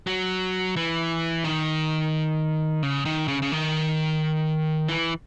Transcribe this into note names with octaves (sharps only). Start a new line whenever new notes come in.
F#3
E3
D#3
C#3
D#3
C#3
C#3
D#3
E3